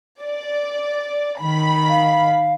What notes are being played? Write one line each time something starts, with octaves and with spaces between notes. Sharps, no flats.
D5
D#3 B5
F5